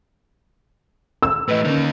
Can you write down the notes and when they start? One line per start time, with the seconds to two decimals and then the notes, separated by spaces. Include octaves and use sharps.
1.22 E6
1.48 A2 E3 B4 D#5
1.65 D3 A#3 C#4 D#4